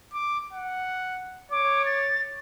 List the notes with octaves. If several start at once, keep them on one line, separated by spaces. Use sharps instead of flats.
D6
F#5
C#5 D6
A6